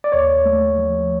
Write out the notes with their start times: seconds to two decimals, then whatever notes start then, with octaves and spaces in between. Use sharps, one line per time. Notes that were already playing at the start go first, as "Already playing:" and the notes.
0.04 D5
0.12 D#2 C#5
0.46 A3
0.78 F3